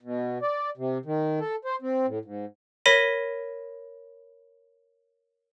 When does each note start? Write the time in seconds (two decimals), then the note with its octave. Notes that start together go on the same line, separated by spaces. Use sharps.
0.01 B2
0.42 D5
0.77 C3
1.05 D#3
1.40 A4
1.65 C5
1.82 C4
2.06 A2
2.25 G#2
2.86 A#4 C#5 B5 A#6 B6 D#7